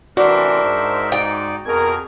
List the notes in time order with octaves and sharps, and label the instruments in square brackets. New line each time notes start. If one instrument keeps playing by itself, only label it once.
[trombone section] A1 C3 E3 [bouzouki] D4 [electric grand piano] F#4 [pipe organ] A#4 C5 E5
[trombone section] G#2
[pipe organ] D#4 D5 [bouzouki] G5
[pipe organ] F2 G#6 [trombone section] B2 G#4 A#4